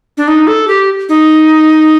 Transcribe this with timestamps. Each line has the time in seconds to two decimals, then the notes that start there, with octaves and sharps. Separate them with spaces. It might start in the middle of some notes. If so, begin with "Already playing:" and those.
0.17 D4
0.28 D#4
0.47 A4
0.68 G4
1.09 D#4